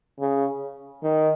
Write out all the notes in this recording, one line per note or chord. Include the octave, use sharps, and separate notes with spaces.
C#3
D#3